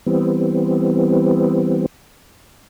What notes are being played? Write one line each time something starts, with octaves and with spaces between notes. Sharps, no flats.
E3 G3 B3 C4